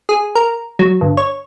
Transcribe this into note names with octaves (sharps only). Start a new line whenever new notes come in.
G#4
A#4
F#3
G1
C#5